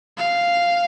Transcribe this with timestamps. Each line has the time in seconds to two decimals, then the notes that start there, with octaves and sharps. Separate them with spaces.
0.18 F5